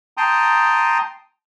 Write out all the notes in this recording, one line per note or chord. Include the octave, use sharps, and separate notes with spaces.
G5 A5 A#5 C6 D#6